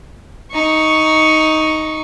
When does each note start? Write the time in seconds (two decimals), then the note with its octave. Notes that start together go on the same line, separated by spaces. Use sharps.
0.52 D#4 C#6